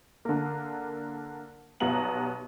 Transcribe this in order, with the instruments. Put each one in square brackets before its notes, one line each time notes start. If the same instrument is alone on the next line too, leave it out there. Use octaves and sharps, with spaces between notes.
[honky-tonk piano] D3 A#3
B1 G3 B3 A#5 F#7